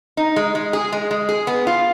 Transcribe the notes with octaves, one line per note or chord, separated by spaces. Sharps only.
D#4
G#3
G#3
G#4
G#3
G#3
G#4
B3
F4